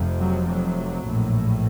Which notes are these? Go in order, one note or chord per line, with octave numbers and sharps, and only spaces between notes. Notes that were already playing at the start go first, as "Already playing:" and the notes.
Already playing: F1 F2 C3
F#3
F#3
A#1 A2